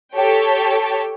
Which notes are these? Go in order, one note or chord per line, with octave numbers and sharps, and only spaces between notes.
G4 A4 C#5 G5